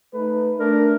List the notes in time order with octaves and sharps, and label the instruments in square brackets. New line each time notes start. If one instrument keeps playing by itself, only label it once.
[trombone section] A3 D#4 B4
[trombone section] A3 D4 [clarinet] A#4